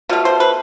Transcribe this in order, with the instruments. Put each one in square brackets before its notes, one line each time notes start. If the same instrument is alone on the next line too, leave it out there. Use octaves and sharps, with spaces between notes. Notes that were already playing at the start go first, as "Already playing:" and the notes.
[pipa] B2 A3 F4
C5
B4